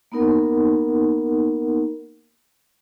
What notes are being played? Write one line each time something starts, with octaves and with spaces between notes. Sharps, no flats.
A#3 B3 D#4 A#4 F#5